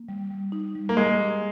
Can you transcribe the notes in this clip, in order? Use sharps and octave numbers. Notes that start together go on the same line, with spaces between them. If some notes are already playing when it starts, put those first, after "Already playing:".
Already playing: A#3
G3
G3
D#4
G3
A#3
G#3 G4
G4